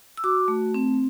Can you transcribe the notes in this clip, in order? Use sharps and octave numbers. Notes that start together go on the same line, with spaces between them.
E6
F#4 D6
A3
C4